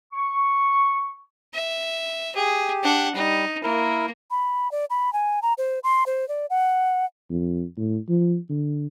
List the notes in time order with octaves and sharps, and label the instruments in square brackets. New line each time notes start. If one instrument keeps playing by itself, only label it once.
[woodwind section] C#6
[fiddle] E5
[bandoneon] G4 [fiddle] G#4
[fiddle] D4 F#5
[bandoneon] G3 [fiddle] D#4
[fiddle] A#3 [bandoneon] E4 A#4
[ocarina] B5
D5
B5
G#5
A#5
C5
C6
C5
D5
F#5
[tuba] F2
A2
F3
D3